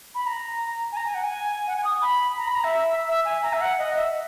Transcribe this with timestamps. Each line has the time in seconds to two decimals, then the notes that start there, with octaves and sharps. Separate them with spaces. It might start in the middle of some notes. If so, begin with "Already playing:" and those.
0.15 B5
0.26 A#5
0.92 G#5
0.97 A#5
1.06 G#5
1.14 F#5
1.24 G#5
1.67 F#5
1.76 G#5
1.84 D#6
2.02 B5
2.38 A#5
2.47 B5
2.55 A#5
2.64 E5
3.08 E5
3.25 G#5
3.43 A#5
3.53 E5
3.61 F#5
3.78 D#5
3.96 E5